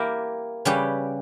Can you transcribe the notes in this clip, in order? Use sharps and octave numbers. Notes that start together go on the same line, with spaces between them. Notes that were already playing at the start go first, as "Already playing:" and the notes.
Already playing: A#3 E4 G4 A#4
C#3 G3 C#4 G4 B4